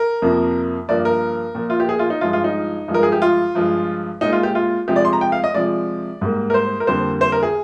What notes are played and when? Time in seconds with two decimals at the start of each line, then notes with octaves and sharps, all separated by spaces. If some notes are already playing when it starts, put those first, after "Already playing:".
Already playing: A#4
0.22 F2 C3 F3 A#3
0.89 G2 F3 A#3 D5
1.05 A#4
1.55 A#2 F3 A#3
1.70 F4
1.80 G4
1.89 G#4
1.99 F4
2.10 D#4
2.21 G2 F3 G#3 F4
2.33 F4
2.44 D#4
2.88 G2 F3 G#3
2.94 A#4
3.03 G#4
3.12 G4
3.22 F4
3.55 G2 F3 G#3
4.21 A#2 G#3 D#4
4.33 F4
4.43 G4
4.55 F4
4.88 C3 F3 G#3 G4
4.96 D5
5.05 C6
5.13 A#5
5.21 G5
5.32 F5
5.44 D#5
5.54 C3 F3 G#3 D5
6.21 G#2 G3 A#3
6.50 A#4
6.54 C5
6.80 A#4
6.87 F2 D3 G3 A#3 C5
7.21 C5
7.32 A#4
7.43 G#4